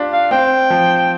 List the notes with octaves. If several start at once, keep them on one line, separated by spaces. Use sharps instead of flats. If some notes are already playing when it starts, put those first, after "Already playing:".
Already playing: D4 F4 G4
F5
C4 G5
F3